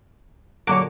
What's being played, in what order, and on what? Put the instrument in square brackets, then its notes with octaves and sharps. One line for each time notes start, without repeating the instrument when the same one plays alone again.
[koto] A#2 D3 F#4 [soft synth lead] F#3 [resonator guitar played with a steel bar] A#3 C#5 [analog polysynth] D6